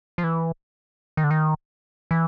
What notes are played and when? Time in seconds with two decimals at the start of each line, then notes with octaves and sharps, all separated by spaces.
0.18 F3
0.24 E3
1.17 D#3
1.24 D3
1.31 D#3
2.11 E3